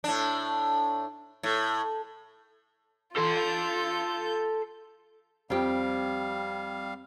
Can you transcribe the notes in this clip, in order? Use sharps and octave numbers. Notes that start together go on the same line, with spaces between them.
A2 D4
A2
F4 A4 C6 G6
F2 G3 C4 F4 G4 F5